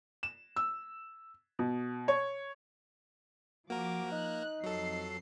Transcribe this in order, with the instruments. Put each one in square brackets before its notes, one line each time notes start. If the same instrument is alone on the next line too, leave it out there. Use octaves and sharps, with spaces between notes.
[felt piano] E7
E6
B2
C#5
[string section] F3 D6 [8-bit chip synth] A#3 A#4 [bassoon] F#4
[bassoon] D#4 [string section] F#6
[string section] F2 C7 [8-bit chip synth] F#3 A4